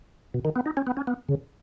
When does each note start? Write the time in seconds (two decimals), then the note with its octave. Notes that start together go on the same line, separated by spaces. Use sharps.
0.34 B2
0.45 D#3
0.56 B3
0.66 D#4
0.77 C#4
0.87 B3
0.97 C#4
1.07 B3
1.29 C#3